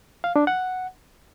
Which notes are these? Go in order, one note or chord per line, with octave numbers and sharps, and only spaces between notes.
F5
D4
F#5